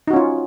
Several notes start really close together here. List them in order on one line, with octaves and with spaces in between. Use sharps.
D#4 F#4 C#4 F4